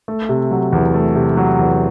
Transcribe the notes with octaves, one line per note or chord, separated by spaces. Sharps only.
A3
C3
F#3
E2
A3
C3
F#3
E2